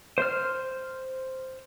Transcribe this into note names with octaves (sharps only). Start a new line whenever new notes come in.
C5 F6